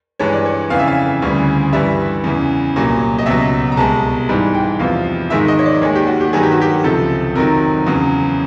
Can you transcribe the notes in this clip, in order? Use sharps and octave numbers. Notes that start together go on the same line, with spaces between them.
G2 E3 G#3 C#5
D5
C#5
F2 C#3 E3 F5
E5
F5
D2 C#3 E3 G3
G2 E3 G3 E5
E2 C#3 E3
C2 A#2 F#3
D#5
C#2 B2 F#3 E5
A#5
C2 B2 G#3 A5
G#2 E3 G3
G5
E2 C3 F3 F5
G#2 D#3 G#3 E5
D#5
C#5
D5
D#2 D#3 G#3 C#5
G4
F#4
G4
G2 D#3 F#3 G#4
G4
F#4
G4
C#2 C3 F3 A4
F2 C3 D#3 F#3 A#4
E2 C#3 F#3